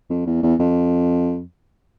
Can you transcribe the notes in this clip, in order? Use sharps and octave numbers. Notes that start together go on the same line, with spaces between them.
F2
E2
E2
F2